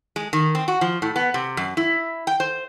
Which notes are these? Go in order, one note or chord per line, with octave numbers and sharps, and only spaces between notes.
G#3
D#3
C4
F#4
F3
A2
B3
C3
F#2
E4
G5
C5